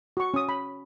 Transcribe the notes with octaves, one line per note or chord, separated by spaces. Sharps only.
F#4 C#6
C#4 D#6
B5